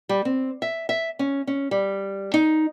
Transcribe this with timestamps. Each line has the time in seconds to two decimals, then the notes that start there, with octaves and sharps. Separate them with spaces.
0.09 G3
0.25 C4
0.62 E5
0.89 E5
1.19 C#4
1.47 C#4
1.71 G3
2.34 D#4